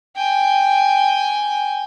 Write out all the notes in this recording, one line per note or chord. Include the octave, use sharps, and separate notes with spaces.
G5 G#5